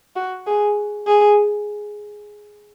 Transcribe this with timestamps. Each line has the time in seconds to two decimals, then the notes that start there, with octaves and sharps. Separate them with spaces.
0.16 F#4
0.47 G#4
1.07 G#4